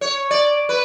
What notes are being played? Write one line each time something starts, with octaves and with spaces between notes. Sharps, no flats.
C#5
D5
B4